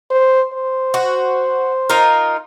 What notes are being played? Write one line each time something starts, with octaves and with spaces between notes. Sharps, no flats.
C5
C5
F#4
D#4 F4 A#4